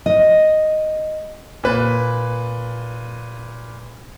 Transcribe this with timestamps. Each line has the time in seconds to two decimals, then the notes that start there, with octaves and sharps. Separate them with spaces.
0.06 D#5
1.64 A#2 B4